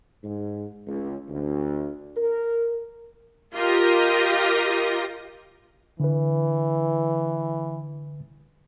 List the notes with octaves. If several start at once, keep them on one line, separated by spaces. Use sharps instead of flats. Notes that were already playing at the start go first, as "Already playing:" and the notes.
G#2
C#2
D2
A#4
F4 G4 A#4 D#5
D3 E3 B4